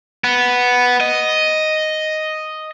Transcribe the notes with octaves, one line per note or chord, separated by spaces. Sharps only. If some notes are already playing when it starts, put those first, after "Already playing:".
B3
D#5